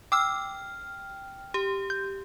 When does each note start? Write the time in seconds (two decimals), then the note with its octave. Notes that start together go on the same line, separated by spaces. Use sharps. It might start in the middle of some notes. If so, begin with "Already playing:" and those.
0.12 G5 D6 E6 F6
1.54 G4
1.90 G6